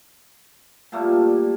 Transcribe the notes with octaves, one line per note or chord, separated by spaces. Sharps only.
A#2 G3 A3 A#3